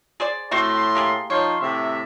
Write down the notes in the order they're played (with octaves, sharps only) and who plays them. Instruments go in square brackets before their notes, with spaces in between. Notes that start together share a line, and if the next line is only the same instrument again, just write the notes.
[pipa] G#4 C5 D5
[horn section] A2 C6 [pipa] A3 C4 F#4
[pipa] A#3 G4 G#4
[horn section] F3 D#4 C6 [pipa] C#5
[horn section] A2 C3 E5